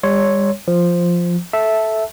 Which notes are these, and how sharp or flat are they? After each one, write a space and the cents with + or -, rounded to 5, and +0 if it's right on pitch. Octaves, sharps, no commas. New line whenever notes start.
G3 +40 C#5 +0 C6 +0
F3 +0 C5 +0
A4 -15 E5 -5 A5 +0